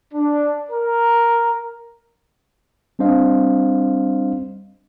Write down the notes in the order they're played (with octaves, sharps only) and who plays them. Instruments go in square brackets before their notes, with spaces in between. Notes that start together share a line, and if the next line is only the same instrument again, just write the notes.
[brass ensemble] D4
A#4
[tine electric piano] G3 C4 D4 C5 D#5 F5